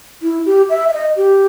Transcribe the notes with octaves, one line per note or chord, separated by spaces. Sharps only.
E4
G4
E5
E5
D#5
G4